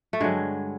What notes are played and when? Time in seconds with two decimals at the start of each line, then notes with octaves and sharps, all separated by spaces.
0.13 A3
0.20 G2 D3 F#3 G#3